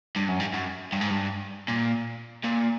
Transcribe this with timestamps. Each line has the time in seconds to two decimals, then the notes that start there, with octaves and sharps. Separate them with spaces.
0.16 G2
0.28 F#2
0.40 G2
0.53 F#2
0.92 G2
1.01 G#2
1.10 G2
1.68 A#2
2.44 A#2